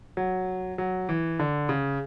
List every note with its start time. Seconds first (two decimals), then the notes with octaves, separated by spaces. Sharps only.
0.17 F#3
0.78 F#3
1.09 E3
1.39 D3
1.69 C#3